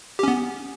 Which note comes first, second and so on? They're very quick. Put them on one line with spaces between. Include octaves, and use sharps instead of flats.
G4 C#4 B3